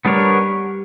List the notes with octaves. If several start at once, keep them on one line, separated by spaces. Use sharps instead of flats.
G3 B3 D4 A#4 C#5